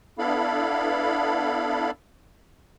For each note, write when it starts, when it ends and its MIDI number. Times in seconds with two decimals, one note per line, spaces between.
0.18 1.91 59
0.18 1.91 62
0.18 1.91 64
0.18 1.91 69
0.18 1.91 77
0.18 1.91 83